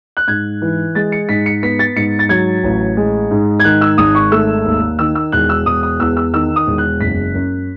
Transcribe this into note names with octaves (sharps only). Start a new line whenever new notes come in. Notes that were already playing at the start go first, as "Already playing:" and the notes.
F#6
G#2 G#6
E3
G#3 A6
C#7
G#2 B6
C#7
B3 B6
A6
G#2 C#7
A6
F#3 G#6
A1
G#3
G#2
G#6
D#3 F#6
E6
G#1 D#6
C#6
A3 E6
D#2
D#3 E6
E6
E1 F#6
E6
E1 D#6
D#6
E2 E6
E6
D#3 E6
D#6
E1
F#6
F#1 B6
F#2